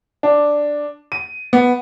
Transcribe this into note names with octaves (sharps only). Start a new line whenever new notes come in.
D4
D#7
B3